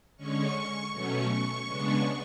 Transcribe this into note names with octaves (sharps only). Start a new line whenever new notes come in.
D3 G#3 C#4 C#6
B2 F#3 A3 C#4 C#6
C#6
C#3 G#3 B3 D4 C#6